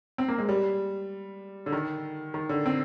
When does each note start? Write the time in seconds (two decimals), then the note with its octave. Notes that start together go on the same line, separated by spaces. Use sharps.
0.18 C4
0.28 A#3
0.38 G#3
0.49 G3
1.66 D3
1.72 D#3
2.34 D#3
2.49 D3
2.66 C4